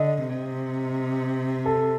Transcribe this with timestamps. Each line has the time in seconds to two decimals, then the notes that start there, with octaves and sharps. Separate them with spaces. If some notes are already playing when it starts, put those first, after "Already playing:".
Already playing: D3 D#5
0.29 C3
1.65 A4